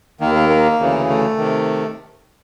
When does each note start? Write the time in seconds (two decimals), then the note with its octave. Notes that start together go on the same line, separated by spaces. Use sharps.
0.20 D#2 D#3 A#3
0.35 A#3
0.49 A#3
0.79 D2 C#3 E3
1.08 A3
1.38 C3 D#3